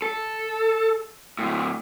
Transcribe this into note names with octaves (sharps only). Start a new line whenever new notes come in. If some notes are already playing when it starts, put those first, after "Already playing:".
A4
D2 A2